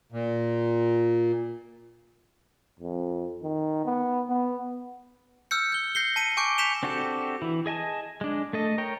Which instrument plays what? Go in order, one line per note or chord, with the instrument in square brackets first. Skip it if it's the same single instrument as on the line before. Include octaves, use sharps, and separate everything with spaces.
[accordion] A#2
[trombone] F2
D#3
B3
B3
[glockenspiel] E6 F6 G6 C#7
G6 G7
G6 A#6 C7 C#7 G7
A5 B6 C#7 D#7
G#5 C#6 D6 G6 D7
G6 B6 C#7 E7 F7 G7
[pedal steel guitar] C4 D4 F#4 G4 A4
E3 E4
G#4 D#5 G#5 A5
G#3 D4
A3 A4 D#5
A#4 C#5 G5